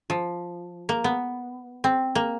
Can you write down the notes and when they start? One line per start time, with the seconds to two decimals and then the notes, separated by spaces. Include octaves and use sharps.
0.10 F3
0.89 A#3
1.04 B3
1.84 C4
2.15 A#3